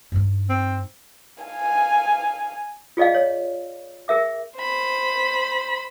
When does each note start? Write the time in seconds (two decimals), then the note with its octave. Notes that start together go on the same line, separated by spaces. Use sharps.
0.12 G2 D#4
0.50 C4
1.43 F5 G#5
2.97 F4 G#4 D5 D#5 F5
3.14 C#5
4.08 G#4 A#4 E5 D6
4.57 C5 B5